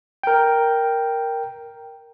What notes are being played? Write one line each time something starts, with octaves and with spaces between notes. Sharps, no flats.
A#4 G5